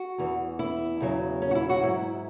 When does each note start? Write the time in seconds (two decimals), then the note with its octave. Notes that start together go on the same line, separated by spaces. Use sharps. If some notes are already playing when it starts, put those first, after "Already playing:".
Already playing: F#4
0.18 E2 E3
0.59 E4
1.00 E2 C#3 F#3
1.42 C#4
1.51 F#4
1.55 E4
1.69 F#4
1.82 G#2 F#3 E4